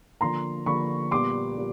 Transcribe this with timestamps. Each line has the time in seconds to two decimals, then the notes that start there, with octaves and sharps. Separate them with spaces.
0.21 D3 F3 A#3 A#5 C6
0.66 D3 F3 A#3 B5 C#6
1.11 A#2 G3 B3 C6 D6
1.57 A#2 G3